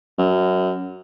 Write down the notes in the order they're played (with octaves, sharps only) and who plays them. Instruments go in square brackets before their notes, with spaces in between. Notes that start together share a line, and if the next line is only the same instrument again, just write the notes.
[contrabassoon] F#2